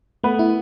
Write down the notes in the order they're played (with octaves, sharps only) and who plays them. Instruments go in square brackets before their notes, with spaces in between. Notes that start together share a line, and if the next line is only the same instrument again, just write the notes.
[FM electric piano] A3 [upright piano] B3 B4
[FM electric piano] E4